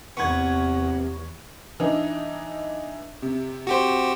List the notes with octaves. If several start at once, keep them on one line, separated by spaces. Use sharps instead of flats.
E2 C3 B3 C#6 G#6
E3 D4 D#4
C3
F#4 G4 C5